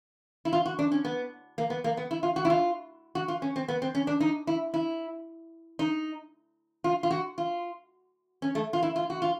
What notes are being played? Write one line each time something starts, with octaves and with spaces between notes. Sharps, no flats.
E4
F4
F#4
D4
C#4
B3
A#3
B3
A#3
B3
E4
F4
F#4
E4
F4
F#4
F4
C#4
C4
B3
C4
C#4
D4
D#4
E4
E4
D#4
F4
F4
F#4
F4
C#4
A3
F4
E4
F4
F#4
F4